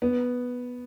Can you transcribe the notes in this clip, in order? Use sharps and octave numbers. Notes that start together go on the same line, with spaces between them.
B3